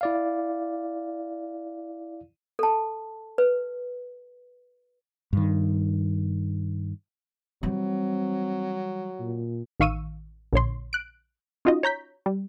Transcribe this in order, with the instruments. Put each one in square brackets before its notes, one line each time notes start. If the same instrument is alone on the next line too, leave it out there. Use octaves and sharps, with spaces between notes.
[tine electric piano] E4 D5 F5
[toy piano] A4 A5
B4
[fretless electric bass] G2 D#3
[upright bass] E3 G3 [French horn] F#3 [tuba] C4
[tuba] A#2
[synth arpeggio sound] A1 D#3 F5 C#6 E6 D#7
A#1 D3 C#5 C6
F#6 D7
C#4 D#4 F4 F#4 D#5
C#5 A#5 G6 B6
G3